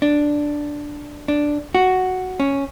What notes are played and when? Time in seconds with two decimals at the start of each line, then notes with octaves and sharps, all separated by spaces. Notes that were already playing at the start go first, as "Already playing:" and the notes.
0.02 D4
1.28 D4
1.75 F#4
2.40 C#4